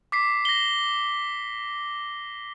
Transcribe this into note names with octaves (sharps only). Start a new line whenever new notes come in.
D6 B6 C7
A#6 C7 G7